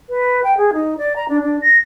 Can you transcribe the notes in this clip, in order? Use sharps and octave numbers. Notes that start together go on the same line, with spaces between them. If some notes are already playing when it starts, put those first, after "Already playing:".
B4
G5
G#4
D#4
D5
A#5
D4
D4
A#6